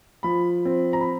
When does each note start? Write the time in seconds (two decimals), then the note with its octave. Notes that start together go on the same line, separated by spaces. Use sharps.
0.23 F3 B5
0.65 C4
0.93 A#5
1.01 B5